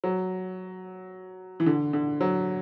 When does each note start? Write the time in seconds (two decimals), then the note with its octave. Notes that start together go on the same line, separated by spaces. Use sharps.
0.04 F#3
1.60 E3
1.66 D3
1.93 D3
2.21 F#3